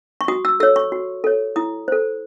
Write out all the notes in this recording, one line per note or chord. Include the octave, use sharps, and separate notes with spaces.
C#6
F#4 D#6
E6
A4 C#5 E6
C#6
F#4
A4 C#5
E4 D#6
A4 C5